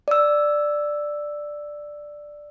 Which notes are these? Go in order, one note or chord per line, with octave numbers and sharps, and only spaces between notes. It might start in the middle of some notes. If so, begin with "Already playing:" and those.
D5 E6